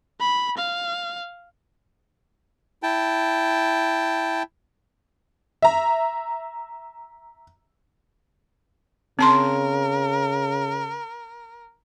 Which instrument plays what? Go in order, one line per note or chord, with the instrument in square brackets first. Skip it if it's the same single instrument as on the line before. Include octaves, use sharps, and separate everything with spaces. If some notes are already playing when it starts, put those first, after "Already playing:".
[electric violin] B5
F5
[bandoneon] E4 G5 A5
[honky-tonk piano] E5 A#5
[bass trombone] C#3 [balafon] C4 A5 C6 [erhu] A#4